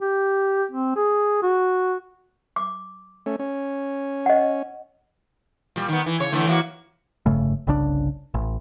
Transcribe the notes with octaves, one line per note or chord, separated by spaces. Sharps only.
G4
C4
G#4
F#4
D6
A3 C#4
C#4
D#5 F#5
A#2 G3
D#3 B3
E3
C#3 C#5
D3 E3 A3
E3 A#3 F#4
F1 G2 C#3 A3
G1 C2 C#3 D4
A1